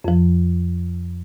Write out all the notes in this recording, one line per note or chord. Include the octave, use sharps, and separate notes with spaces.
F2 F3